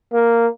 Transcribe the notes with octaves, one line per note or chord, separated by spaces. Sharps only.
A#3